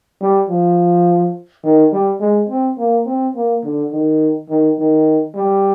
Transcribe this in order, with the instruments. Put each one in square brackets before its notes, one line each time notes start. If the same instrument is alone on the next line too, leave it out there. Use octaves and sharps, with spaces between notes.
[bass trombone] G3
F3
D#3
G3
G#3
C4
A#3
C4
A#3
D3
D#3
D#3
D#3
G3